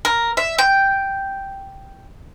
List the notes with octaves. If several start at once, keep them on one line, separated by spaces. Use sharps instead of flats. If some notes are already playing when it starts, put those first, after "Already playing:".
A#4
E5
G5